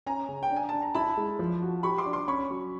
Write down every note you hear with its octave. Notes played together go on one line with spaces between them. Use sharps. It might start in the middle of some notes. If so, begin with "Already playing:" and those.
C#4 G#5 A#5
C#3
G5
D4
G#5
D4 A5
A#5
E4 A5 B5
G#3
F3
F#4
G4 B5 C#6
C6 D6
D4
C6 D6
C#4 B5 C#6
F#3